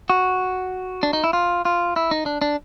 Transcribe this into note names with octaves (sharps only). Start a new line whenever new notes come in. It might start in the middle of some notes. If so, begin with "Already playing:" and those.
F#4
D4
D#4
E4
F4
F4
E4
D#4
D4
D4